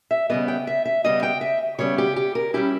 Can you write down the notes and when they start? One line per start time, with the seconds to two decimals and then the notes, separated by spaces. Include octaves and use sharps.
0.11 E5
0.30 C#3 G3 B3 D#5
0.48 G5
0.67 E5
0.85 E5
1.04 C#3 G3 B3 D#5
1.23 G5
1.41 E5
1.78 C#3 G3 B3 C#5
1.98 G4
2.16 G4
2.35 A#4
2.54 G3 C#4 E4 G4